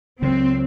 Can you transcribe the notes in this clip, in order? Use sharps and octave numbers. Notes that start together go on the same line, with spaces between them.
C#2 C#3 F#3 C4